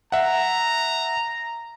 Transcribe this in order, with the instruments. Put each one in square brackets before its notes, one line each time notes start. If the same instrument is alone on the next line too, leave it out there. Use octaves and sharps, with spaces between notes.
[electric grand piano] E5 F#5 [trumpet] A#5